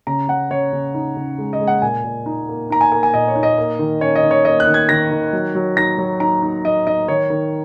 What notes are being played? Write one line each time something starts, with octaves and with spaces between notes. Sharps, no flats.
C#3 A#5
C#3 F#5
C#3 C#5
C#3
D#4
C#3
G#3
D#5
G#3
F#5
A#2 G#5
A#2
D#4
A#3
D#4 A#5
G#5
A#3 G#5
G#5
A#2 D#5
C#5
D#4
D#5
A#3
D#3
C#4 C#5
D#5
D#3
C#5
A#3 D#5
F#6
D#3
G#6
D#3 A#6
D#3
F#3
F#3
D#4 A#6
F#3
D#4 A#5
D#4
D#4 D#5
D#4 D#5
D#3 C#5
D#3